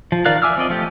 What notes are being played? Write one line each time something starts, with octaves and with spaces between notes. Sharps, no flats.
F3
D#3 A#4 D5 F5 F#6
E5 G#5 D6 E6 F6
F3 C4 D5 D#5
F3 A3 F4 G4